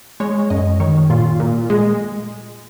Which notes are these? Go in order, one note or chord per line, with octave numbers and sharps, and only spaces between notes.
G#3 C#5
F#2 D#5
D#3 C#5
A#2 F4
A#2
G#3